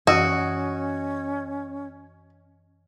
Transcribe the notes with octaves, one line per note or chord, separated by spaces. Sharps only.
F#2 E3 C#4 F#4 D#5